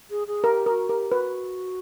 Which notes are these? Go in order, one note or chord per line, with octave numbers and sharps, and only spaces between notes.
G#4
G#4
G4 A#4
G4 A#4
F#4
G4 A#4
F#4 B4